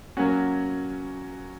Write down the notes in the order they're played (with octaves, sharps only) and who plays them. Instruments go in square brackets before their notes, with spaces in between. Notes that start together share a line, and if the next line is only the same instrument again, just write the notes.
[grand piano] F#3 A#3 C#4 F#4